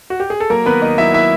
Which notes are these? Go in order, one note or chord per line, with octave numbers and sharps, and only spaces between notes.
F#4
G4
G#4
A4
F#3 A#3 A#4
D#3 B3 B4
D#2 D#4 D#5
F#3 E4 E5
E4 E5